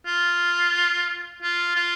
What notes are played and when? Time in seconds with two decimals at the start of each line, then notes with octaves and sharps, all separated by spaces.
0.06 F4
1.42 F4
1.76 F4